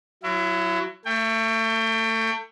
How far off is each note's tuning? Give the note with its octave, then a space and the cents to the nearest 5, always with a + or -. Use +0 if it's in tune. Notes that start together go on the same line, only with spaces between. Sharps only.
F#3 +0 E4 +35
A3 +30 G5 +20